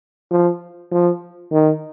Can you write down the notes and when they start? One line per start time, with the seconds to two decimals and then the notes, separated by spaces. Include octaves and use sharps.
0.31 F3
0.92 F3
1.52 D#3